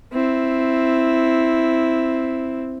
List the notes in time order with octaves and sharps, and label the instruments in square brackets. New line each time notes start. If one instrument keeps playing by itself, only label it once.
[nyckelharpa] C4 E4